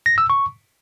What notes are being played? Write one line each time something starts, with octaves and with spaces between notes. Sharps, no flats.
A#6
E6
C#6